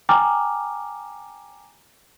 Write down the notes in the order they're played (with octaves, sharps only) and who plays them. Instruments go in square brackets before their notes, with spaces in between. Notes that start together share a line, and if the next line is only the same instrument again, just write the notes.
[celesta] G5 G#5 A#5 D6 F6